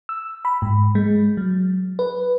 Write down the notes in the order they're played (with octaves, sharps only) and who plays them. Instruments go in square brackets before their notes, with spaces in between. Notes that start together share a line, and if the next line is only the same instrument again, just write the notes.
[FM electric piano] E6
B5
G#2
G#3
F#3
B4